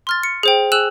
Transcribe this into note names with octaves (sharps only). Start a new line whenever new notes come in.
C6 F6 A6
C#7
G#4 C5 G5
G#4 G#5 E6 F#6 E7 F#7